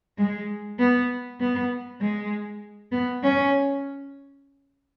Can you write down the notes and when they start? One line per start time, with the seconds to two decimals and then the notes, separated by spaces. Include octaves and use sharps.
0.18 G#3
0.79 B3
1.40 B3
2.01 G#3
2.92 B3
3.23 C#4